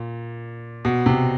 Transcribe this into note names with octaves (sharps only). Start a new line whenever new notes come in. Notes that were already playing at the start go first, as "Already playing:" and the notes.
Already playing: A#2
B2
C3